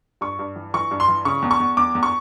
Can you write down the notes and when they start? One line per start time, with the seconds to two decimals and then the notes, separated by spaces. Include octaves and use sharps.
0.21 G2 C#6
0.39 G2
0.56 E3
0.74 E3 C#6
0.91 G2
1.00 C6
1.08 E3
1.25 C#3 C#6
1.42 E2
1.51 C#6
1.60 E2
1.77 E2 D6
1.95 E2
2.03 C#6